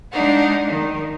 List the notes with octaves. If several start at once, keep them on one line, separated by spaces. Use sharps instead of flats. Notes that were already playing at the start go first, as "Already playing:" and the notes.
G#3 D4 D#4 F5 F#5
D#3